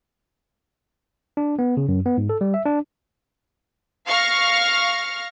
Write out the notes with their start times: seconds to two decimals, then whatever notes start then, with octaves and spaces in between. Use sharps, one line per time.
1.37 D4
1.59 B3
1.77 C#3
1.89 F#2
2.06 B3
2.18 G#2
2.29 A4
2.41 G3
2.54 E5
2.66 D4
4.07 F5 C#6 F6 A#6